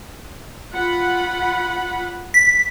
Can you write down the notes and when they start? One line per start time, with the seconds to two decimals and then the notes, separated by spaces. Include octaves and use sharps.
0.74 F4 F#5 B5
2.34 B6